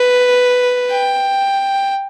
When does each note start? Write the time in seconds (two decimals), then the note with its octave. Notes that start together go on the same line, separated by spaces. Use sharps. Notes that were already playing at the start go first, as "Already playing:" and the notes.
Already playing: B4
0.91 G5